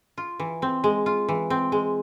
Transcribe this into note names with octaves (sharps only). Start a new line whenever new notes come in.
F4
E3
C4
G#3
F4
E3
C4
G#3